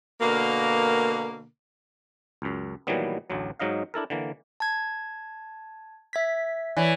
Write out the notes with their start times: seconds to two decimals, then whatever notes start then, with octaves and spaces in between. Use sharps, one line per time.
0.20 B2 D3 A#3
2.42 C#2 F#2
2.87 A#2 D#3 E3 F#3 G3 B3
3.30 A1 D2 F#3
3.59 G#2 F#3 D#4 D#5 F5
3.94 D4 E4 A4 A#4
4.10 D3 E3 A#3
4.60 A5 G#6
6.13 E5 G#6 B6
6.77 E3 C#5 D5